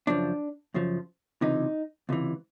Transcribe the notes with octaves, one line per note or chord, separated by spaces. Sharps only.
F#2 C#3 F3 D4
F#2 C#3 F3
C#2 C3 E3 D#4
C#2 C3 E3